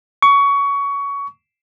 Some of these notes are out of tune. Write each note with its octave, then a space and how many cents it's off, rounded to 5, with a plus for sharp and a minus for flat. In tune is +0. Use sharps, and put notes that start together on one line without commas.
C#6 +20